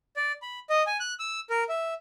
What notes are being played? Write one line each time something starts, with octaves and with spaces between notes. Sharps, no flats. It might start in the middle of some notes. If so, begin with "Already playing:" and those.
D5
B5
D#5
G#5
F#6
E6
A#4
E5